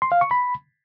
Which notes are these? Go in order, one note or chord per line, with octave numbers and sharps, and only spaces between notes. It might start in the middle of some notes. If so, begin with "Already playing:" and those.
C6
F5
C#6
B5